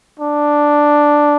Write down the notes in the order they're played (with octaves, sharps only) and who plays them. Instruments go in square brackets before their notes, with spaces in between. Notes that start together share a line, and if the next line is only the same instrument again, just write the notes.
[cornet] D4